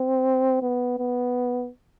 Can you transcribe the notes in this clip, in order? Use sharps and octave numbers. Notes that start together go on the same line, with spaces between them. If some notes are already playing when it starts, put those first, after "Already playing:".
Already playing: C4
B3
B3